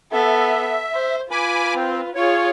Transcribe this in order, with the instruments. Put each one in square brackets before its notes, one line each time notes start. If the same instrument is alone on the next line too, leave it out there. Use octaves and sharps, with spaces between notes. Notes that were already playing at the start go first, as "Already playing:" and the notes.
[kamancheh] B3 A4 [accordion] E5
[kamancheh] C5
[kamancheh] F4 B4 [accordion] G#5 B5 D6
[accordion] C4
[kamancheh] F4 G#4 [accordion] C#5